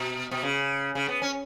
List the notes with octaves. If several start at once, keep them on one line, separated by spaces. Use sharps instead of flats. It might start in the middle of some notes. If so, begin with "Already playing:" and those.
Already playing: B2
B2
C#3
C#3
B3
C#4